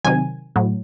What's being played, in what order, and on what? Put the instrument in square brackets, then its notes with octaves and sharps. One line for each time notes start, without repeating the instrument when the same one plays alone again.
[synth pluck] C3 D#3 F#3 G#5
A2 F#3